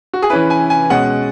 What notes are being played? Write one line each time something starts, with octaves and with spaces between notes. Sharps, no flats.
F#4
G#4
E3 C#4 E4 B4
G#5
G#5
B2 G#3 C#4 F#5